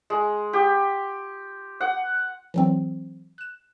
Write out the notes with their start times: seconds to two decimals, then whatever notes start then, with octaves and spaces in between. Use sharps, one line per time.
0.10 G#3
0.53 G4
1.81 F#5
2.54 E3 F#3 C4
3.38 F#6 E7